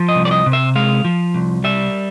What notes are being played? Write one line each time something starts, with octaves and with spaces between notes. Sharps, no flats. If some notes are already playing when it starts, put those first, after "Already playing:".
Already playing: F3
D#5
C2
D5
D#5
C3
E5
G#3 F5
F3
C2
G3 E5